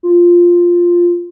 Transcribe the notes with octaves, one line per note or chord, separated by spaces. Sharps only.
F4